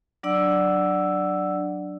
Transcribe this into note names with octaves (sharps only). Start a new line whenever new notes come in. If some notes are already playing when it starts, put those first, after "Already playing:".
F#3 D4 D5 F#5 E6